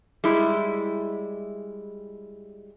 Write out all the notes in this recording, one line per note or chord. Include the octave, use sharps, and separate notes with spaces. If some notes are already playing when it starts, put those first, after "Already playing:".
G3 G#3 E4